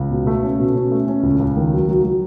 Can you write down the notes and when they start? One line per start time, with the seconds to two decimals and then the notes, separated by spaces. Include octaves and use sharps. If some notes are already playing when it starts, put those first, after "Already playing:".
Already playing: C#2
0.10 B2
0.27 A3
0.43 C#4
0.59 B2
0.76 C#4
0.92 A3
1.08 C#4
1.23 C#2
1.39 C#2
1.57 D#3
1.73 F#3
1.88 F#3
2.04 F#3